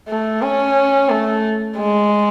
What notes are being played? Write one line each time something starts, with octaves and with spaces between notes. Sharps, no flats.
A3
C#4
A3
G#3